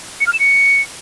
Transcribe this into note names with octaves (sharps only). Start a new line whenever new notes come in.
C#7
F6
E7
C#7